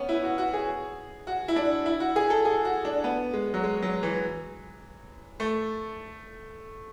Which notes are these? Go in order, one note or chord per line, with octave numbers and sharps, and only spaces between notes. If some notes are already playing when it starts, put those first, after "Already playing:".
Already playing: B3 C#4
E4
F#4
F#4
G#4
F#4
E4
D4
E4
F#4
G#4
A4
G#4
F#4
D4
B3
G#3
F#3
G#3
F#3
E3
A3